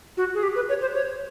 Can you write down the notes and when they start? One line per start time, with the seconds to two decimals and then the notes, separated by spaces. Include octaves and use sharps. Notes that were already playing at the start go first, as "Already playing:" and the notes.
0.17 F#4
0.34 G#4
0.43 G4
0.55 B4
0.69 C#5
0.81 C5
0.94 C#5